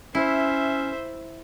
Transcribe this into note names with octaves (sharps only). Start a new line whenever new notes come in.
C#4 E4 C5 E5